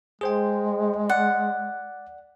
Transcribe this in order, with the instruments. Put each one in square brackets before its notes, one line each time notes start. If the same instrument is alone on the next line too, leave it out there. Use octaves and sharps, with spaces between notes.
[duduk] G#3 [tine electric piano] G#4 C5 G5
[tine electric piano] D5 [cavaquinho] F#5